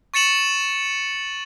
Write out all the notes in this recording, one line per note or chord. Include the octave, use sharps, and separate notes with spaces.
C#6 A6 C#7 E7 F#7